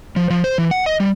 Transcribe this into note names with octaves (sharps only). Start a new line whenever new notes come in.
F3
F3
C5
E3
F#5
D#5
G3